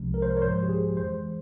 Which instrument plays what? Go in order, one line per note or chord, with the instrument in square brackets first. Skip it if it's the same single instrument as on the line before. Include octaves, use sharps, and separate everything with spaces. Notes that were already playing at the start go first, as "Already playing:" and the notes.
Already playing: [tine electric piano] C2 C3 F3 G#3
A#4
C5
A#4
C#5
G#2 F3 G#3 C5
G4
G#4
F2 E3 G#3 C5